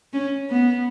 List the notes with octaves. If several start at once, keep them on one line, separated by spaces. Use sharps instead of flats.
C#4
B3